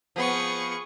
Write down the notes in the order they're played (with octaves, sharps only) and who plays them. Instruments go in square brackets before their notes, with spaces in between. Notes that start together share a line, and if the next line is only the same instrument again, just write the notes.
[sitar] F3 B3 [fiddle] G#4 C#6